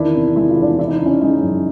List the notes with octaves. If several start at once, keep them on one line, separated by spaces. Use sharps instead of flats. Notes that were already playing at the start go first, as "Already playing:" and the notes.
Already playing: E2 D#3 D4 E4
C3
G#3 E4
F4
E2 D4 E4
E3 E4
D#4
C#3 D4
C#4 D#4
G#3 C#4 D#4
F#2